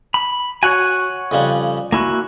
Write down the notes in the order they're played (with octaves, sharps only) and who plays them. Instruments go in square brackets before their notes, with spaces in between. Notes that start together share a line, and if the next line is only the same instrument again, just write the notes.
[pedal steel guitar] B5
[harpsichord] F#4 [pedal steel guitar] C#5 F#5 G#5
[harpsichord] F2 C#3 G3
[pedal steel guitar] A#3 E4 F#4 [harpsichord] G#5